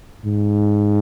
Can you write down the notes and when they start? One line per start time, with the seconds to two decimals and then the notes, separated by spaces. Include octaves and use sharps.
0.25 G#2